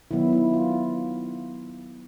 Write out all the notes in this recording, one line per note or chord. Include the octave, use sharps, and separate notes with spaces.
D#3 F#3 B3 E4
E4
F4